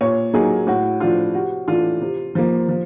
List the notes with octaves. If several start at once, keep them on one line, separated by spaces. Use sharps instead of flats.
A#2 C#5
F#3 A#3 D#4 G#4
A2 F#4
F3 A3 D4 F4
C3 F#4
E3 A3 D4 F4
C3
F3 A#3
F3